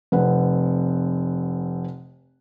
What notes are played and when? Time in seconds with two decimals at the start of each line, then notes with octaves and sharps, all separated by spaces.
0.12 F1 C4 B4 F#5